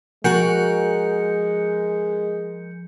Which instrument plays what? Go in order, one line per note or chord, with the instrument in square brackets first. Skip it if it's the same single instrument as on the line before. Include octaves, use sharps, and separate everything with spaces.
[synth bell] F3 G6 C#7 [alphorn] G#3 [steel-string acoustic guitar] F#4 A#4 F#5